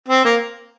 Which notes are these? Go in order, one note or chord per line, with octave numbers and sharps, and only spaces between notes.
C4
A#3